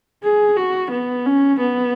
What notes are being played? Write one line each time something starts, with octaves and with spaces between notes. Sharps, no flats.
G#4
F#4
B3
C#4
B3